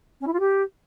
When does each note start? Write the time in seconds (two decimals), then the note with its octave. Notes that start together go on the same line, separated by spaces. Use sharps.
0.20 C#4
0.26 E4
0.33 F4
0.39 G4